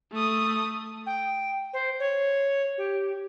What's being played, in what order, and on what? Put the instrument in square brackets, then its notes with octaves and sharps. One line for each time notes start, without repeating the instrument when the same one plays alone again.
[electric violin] A3 D#6
[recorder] G5
C5
C#5
G4